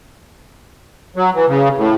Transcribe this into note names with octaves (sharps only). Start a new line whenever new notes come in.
F#3
E3
C#3
A2